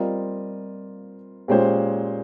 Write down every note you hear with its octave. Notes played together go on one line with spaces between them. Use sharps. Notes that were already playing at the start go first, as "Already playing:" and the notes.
Already playing: G3 C4 F4 A#4 D#5
A#2 G#3 C#4 G4 C5